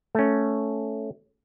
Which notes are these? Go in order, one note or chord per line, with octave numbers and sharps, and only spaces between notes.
A3 C#4